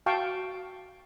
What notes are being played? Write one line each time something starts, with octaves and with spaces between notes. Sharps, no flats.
F#4 F5 G5 A5 C#6